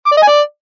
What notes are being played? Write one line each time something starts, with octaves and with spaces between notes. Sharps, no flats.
D6
D5
D#5
G#5
D5